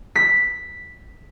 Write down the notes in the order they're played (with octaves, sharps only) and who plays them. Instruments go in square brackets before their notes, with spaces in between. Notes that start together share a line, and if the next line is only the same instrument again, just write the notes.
[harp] B6